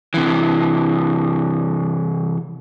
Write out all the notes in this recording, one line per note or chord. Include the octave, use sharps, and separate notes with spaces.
C3 E3